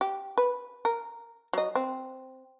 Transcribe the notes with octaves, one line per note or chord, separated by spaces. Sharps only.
G4
B4
A#4
F#3 D#5
C4